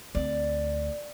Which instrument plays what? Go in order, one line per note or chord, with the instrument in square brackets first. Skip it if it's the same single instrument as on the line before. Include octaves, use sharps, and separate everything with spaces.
[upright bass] D2 C4 [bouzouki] D5